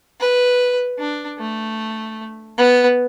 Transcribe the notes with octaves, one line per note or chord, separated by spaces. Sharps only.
B4
D4
A3
B3